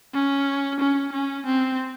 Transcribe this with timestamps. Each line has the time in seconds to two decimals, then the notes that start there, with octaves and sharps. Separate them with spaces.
0.14 C#4
0.80 C#4
1.12 C#4
1.46 C4